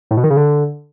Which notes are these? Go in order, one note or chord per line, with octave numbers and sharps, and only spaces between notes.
A2
B2
D#3
C#3
D3